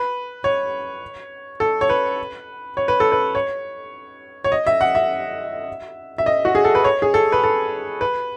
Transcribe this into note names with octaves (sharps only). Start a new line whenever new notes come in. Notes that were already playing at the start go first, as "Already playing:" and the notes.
Already playing: B4
C#5
A4
C#5
B4
C#5
B4
A4
B4
C#5
C#5
D#5
E5
F#5
E5
E5
D#5
F#4
G#4
A4
B4
C#5
G#4
A4
B4
A4
B4